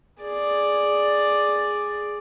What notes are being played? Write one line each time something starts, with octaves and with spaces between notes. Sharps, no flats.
G#4 D5